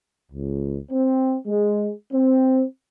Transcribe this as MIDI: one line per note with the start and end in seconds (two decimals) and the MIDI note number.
0.32 0.78 37
0.91 1.35 60
1.47 1.90 56
2.13 2.64 60